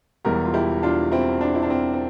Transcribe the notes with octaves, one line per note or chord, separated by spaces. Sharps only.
E1 E2 E3 G3 G4 A#4
F4
E4 G4
D4 F4
C4 E4
D4
E4
D4
C4
C4